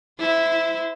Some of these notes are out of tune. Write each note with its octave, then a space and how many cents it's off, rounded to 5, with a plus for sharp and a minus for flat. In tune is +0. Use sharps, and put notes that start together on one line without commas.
E4 -5 C5 -35